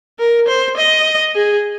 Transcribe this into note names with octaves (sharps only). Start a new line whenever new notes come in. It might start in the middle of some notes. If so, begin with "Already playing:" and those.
A#4
C5
D#5
G#4